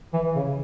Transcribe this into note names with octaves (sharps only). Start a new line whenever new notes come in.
E3
C#3